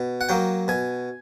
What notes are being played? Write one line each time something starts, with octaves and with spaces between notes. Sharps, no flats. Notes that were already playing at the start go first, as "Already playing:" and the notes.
Already playing: B2
F#5
F#3 A#3 G5
B2 G#5